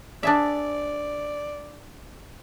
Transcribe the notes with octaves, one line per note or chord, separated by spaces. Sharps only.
D4 G#4 D5 E5